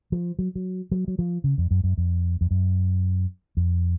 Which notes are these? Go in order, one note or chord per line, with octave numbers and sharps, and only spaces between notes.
F3
F#3
F#3
F#3
F#3
F3
C#3
F2
F#2
F#2
F2
F2
F#2
F2